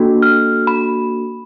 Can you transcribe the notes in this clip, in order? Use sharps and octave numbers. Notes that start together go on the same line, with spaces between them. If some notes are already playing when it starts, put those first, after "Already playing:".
Already playing: A#3 D4 F#4 A4
F6
B5